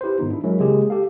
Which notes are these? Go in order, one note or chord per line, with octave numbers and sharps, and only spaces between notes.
E4 G4 B4 C5
G#2 D#3 B3 D#4 F4
D4 E4
F#3 G#3 C#4 E4 A#4 E5
C#3 G#3 A#3 F4 G4 G#4
G4 A4 F5